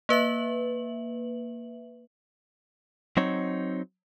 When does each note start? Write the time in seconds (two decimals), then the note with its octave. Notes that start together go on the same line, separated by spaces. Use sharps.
0.09 A#3 B4 E5 F#7
3.17 F#3 C4 D#4 C#5